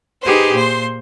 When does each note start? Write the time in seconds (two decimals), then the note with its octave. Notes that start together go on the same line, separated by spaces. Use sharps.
0.23 D#4 G4 G#4 B4 C5
0.54 A#2 C5 C6